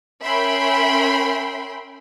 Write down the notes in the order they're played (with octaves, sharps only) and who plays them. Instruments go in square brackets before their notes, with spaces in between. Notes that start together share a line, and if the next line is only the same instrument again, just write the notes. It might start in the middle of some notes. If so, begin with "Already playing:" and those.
[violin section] C#4 A#4 E5 G5 B5 C6